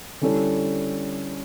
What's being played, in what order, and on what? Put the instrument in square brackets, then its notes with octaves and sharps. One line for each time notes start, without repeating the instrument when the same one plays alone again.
[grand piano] D3 G3 C#4 E4 A4